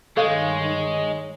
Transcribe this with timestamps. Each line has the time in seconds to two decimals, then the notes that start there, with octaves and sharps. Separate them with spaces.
0.17 G2 D#3 G#3 D#4 A4 C#5 F5